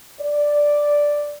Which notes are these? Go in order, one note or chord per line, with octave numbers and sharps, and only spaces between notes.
D5